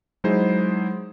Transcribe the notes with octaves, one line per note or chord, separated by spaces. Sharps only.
F#3 G#3 D#4 E4 G#4 C5